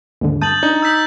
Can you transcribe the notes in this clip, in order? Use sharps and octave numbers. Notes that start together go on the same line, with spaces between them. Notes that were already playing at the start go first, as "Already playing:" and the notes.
D#2 G#2 D3
G2 A5 D#6 G6 A6 F#7
D4 D#4
E6 G6 B6